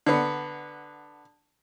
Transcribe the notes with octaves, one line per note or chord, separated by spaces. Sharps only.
D3 B3